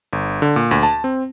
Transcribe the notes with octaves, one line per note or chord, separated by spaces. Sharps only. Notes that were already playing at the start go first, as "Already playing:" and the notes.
G1
D3
A#2
D2
A5
C4